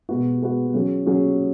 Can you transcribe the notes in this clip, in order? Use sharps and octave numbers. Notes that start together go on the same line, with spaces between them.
B2 G#3 B3 F#4
B2 G#3 B3 F#4
F#3 C#4 G#4
F#3 C#4 G#4